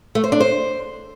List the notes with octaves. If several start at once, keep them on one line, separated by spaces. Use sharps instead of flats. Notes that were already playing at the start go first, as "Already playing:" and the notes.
A3
C5
D4
C5